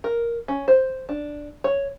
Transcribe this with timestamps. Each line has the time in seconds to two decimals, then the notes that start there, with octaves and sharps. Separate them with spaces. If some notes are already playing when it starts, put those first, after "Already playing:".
0.04 A#4
0.48 C#4
0.68 C5
1.09 D4
1.64 C#5